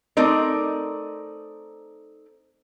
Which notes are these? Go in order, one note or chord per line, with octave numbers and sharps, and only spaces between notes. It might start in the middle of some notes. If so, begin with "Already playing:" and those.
A3 C4 D#4 A#4 D5